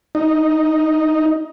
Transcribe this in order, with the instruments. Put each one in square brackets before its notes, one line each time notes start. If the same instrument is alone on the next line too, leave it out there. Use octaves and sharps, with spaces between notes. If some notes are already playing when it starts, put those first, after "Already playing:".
[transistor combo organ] D#4